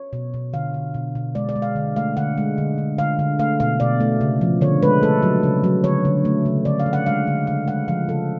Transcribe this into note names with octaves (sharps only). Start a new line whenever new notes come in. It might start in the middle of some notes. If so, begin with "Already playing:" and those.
Already playing: C#5
B2
B2
D3 F5
D3
B2
B2
G#3 D5
D5
G#3
F5
D3
A3 F5
D3 F#5
G#3
D3
D3
D3 F5
D3
A3 F5
B2 F5
B2 D5
A3
C#3
F3
D3 C#5
G#3 B4
A3 A4
F#3
C#3
F#3
D3 C#5
D3
A3
C#3
D3 D5
F5
D3
F#5
G#3 F5
D3
C#3 F5
G#3 F#5
F3 F5
C#3 A4